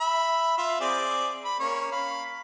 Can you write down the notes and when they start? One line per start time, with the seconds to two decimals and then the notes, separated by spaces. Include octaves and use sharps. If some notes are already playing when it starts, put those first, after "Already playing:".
0.01 E5 B5
0.58 F4 E5
0.81 C4 G#4 D5
1.45 B5
1.59 A#3 C#4 C#5
1.92 F5 B5